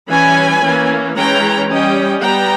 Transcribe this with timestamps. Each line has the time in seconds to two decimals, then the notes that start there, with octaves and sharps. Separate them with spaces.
0.11 E3 G3 C#4 G#5 B5
0.64 E3 A#3 C#4
1.17 E3 G#3 C#4 G5 A#5
1.70 G3 C#4 D#5 G5
2.24 G3 B3 G5 A#5